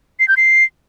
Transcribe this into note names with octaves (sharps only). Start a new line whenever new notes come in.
C7
G6
C7